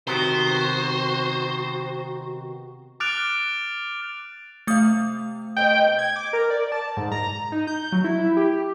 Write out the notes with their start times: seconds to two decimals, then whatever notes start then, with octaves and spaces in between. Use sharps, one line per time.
0.07 C3 D#3 B3 F#4 C5
3.00 D6 F6 F#6 A6 D7 F7
4.67 C3 A3 F5 D#6
5.57 B2 G#3 C4 G5
5.98 G#6
6.16 D6
6.33 A#4
6.50 D5
6.72 A5
6.97 G#2
7.12 A#5
7.52 D#4
7.67 G6
7.92 F#3
8.04 E4
8.37 G4